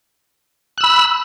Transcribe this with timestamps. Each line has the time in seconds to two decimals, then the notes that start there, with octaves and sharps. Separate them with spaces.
0.78 F#6
0.81 E6
0.84 B5